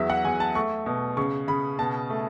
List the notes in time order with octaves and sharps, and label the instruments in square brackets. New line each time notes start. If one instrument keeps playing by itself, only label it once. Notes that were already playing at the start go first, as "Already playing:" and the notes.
Already playing: [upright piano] E2 F#3 E5
F#5
E2 G#5
A5
A3 C#6
B2
C#3 C#6
C#3 B5
B2 A5
A3